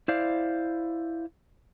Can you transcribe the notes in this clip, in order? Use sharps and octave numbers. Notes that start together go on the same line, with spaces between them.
E4 C5 D5 F5